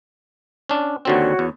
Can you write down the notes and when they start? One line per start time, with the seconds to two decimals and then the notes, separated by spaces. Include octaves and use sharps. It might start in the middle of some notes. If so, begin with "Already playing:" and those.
0.69 C#4 D4
1.05 D#2 D3 C4 F#4 C#5
1.39 E2